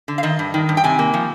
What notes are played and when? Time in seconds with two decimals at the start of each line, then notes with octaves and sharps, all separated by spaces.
0.08 D3
0.18 F5
0.23 D#3 D#5
0.39 G2
0.54 D#3
0.69 G2
0.77 G5
0.84 C3 G#5
0.99 A#3
1.14 F3